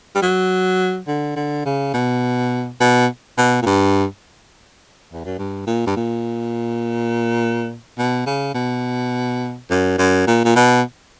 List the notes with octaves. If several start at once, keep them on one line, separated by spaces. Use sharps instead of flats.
G3
F#3
D3
D3
C#3
B2
B2
B2
A#2
G2
E2
F#2
G2
A#2
G2
A#2
B2
C#3
B2
F#2
F#2
A#2
A#2
B2